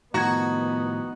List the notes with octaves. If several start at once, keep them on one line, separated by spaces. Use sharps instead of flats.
A2 D#3 F3 B3 D#4 F#4 A#5 G#6